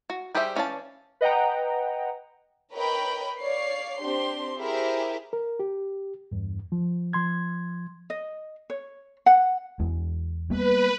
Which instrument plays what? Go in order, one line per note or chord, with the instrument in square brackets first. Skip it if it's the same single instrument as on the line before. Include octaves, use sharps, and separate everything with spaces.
[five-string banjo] F#4
G3 G4 G#4 C5 E5
E3 C#4 D5 F5 A5
[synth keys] B4 D#5 F#5 G5 A#5
[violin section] A#4 B4 C#5 D#5 G5 B5
C#5 D5 F5 C7
C4 D4 G4 C6
E4 G4 G#4 A#4 C5 E5
[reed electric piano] A#4
G4
E2 G2
F3
F3 C6 G#6
[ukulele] D#5
C#5
F#5
[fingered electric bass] E2 G#3
[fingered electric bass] G3 A#3 B3 [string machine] B4